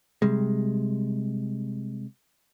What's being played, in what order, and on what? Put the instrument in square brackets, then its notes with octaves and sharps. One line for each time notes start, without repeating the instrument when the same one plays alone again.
[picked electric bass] C3 G3 G#3